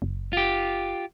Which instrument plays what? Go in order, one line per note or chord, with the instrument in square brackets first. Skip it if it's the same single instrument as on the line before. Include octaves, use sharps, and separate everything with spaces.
[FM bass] F#1
[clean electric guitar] F4 G4